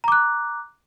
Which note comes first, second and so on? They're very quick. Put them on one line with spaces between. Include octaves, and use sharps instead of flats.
A#5 D6 F#6